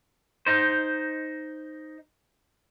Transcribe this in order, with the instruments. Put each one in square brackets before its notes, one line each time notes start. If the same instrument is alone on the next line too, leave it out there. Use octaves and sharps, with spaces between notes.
[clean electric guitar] D#4 C5